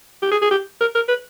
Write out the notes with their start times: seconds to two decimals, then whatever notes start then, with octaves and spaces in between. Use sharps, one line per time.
0.22 G4
0.32 G#4
0.42 G#4
0.51 G4
0.81 A#4
0.95 A#4
1.08 B4